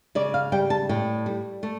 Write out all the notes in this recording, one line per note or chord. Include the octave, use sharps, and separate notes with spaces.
C#3 D5
F5
G3 G5
A5
A2 G5
G3
A3